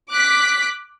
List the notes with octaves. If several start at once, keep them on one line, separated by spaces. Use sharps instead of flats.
D6 F#6 B6